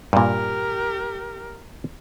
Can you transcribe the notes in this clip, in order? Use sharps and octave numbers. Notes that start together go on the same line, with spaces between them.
G2 A#2 G4 A#4